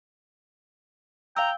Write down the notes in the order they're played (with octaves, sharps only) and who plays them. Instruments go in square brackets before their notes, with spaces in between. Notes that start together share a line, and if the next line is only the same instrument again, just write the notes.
[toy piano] F5 E6 [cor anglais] G5 [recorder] A#5